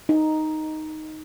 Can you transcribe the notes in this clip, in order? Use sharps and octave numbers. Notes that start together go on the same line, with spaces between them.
D#4